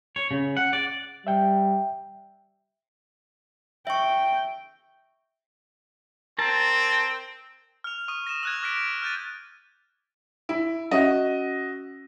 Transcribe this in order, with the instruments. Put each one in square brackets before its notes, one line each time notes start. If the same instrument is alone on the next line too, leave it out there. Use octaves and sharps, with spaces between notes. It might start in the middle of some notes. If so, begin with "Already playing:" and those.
[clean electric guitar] C#5
C#3
F#5
D5
[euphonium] G3 [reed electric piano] E5 G5
[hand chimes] E5 C#6 [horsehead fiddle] G5
[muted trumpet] C4 [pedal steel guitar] A#4 A5
[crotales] F6 F7
C#6 D#6 D#7
A#6 D#7 E7
E6 F#6 G#6
D6 F6 A#6 B6 D7 F7
F6 G6 A6 D#7
[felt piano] E4
[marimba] C#4 E5 [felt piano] F#4 D#5